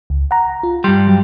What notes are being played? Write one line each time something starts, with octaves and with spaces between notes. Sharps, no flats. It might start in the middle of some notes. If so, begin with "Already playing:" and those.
C#2
F#5 A#5
F4
G2 G3 C6
F#3